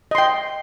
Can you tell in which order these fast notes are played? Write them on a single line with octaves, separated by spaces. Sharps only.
D#5 C6 G5